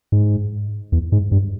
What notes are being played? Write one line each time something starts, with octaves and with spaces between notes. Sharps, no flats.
G#2
E2
G#2
G2